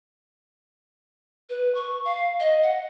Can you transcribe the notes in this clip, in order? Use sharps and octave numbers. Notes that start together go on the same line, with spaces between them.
B4
C#6
F5
D#5
F#5